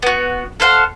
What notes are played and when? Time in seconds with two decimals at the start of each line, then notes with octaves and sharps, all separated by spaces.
0.02 B3 F#4
0.60 A4 C5 F5 F#5